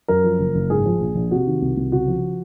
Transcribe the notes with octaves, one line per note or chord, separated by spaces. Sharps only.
F#2 A#4
F3
F#1
F#1
G#2 G#4
F3
A#1
A#1
C3 F#4
D#3
C2
C2
C#3 F#4
F3